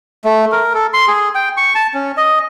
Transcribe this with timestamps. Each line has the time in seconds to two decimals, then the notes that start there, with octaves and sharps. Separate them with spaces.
0.24 A3
0.52 A#4
0.74 A4
0.93 C6
1.08 G#4
1.35 G5
1.57 C#6
1.75 A5
1.94 C#4
2.17 D#5